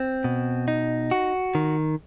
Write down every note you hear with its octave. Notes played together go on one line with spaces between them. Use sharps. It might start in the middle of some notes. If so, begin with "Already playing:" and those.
Already playing: C4
B2
D#4
F#4
D#3